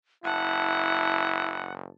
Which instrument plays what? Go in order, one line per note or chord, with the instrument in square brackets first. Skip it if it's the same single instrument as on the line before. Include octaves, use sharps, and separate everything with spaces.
[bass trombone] F#1 [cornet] E4 [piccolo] F#5 [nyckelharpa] A5